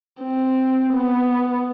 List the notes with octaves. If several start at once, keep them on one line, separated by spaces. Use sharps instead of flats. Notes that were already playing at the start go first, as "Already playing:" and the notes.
C4
B3